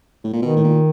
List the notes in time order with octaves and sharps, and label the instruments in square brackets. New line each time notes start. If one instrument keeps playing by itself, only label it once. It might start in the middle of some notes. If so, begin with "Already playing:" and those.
[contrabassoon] A2
A#2
[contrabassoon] B2 [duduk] D#3
[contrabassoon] A2
A#2